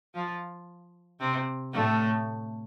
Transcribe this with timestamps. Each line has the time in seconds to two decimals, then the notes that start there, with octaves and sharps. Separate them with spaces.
0.14 F3 F4
1.20 C3 C4
1.73 A2 A3